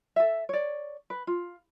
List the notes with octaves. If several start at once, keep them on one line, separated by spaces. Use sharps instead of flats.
A4 E5
C#5 D5
B4
F4